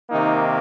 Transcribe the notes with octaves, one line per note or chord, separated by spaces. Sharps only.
C3 D#3 A#3 D#4